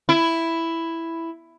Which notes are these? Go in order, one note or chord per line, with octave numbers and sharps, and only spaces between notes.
E4